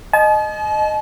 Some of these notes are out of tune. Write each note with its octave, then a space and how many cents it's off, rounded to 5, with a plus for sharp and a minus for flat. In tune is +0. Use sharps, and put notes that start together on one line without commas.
D#5 -15 A5 -45